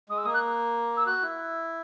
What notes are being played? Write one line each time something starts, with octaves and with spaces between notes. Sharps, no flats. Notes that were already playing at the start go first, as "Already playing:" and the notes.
G#3 D#6
E6
A#3 D#6
F#6
E6
F#4 F#6
E4